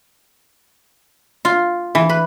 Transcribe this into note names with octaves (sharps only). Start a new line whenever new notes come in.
F4
E3
B4